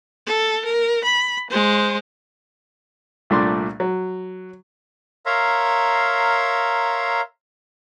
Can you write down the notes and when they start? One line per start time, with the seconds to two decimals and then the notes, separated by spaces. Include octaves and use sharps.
0.27 A4
0.64 A#4
1.04 B5
1.50 G#3 C5
3.30 C2 A#2 A3 D4 D5 C6
3.80 F#3
5.26 A#4 C#5 E5 F5 A#5 C6